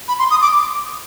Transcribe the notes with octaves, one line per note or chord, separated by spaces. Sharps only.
B5
C6
D#6
D6